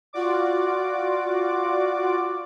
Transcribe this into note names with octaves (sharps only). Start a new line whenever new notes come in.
F4 F#4 D5 D6